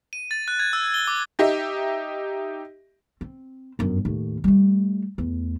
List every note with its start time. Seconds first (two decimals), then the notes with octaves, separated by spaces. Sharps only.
0.13 D#7
0.31 A6
0.48 F#6
0.60 G#6
0.73 E6
0.94 G7
1.07 D6
1.39 D#4 G4 D#5 E5
3.21 C4
3.79 G1 F#2
4.05 D#2 A2
4.44 G3 A3
5.18 E2 A3